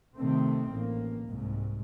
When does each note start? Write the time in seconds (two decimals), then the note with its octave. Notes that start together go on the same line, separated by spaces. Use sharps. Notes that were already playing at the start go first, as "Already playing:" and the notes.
0.18 C3 D#3 A3 C4
0.72 A1 A#3
1.28 C2 G#2